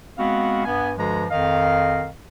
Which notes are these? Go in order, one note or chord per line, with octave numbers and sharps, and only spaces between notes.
G#3 B3 C4 F#4 F5
G2 B3 G#5
G2 D3 F3 G#3 F#4 A#5
F2 D#3 D#5 F5